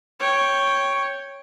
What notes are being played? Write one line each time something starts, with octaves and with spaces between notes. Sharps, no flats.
C#5 G5